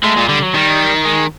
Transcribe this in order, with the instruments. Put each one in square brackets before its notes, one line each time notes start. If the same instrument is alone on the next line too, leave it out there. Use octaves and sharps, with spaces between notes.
[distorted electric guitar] A2 [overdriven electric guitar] G#3
[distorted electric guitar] A#2
[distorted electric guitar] D3 [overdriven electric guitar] G3
[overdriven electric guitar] F#3
[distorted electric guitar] D#3 [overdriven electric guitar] G3
[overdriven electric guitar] G#3